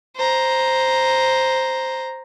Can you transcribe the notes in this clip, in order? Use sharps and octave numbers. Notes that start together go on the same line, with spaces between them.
C5 A#5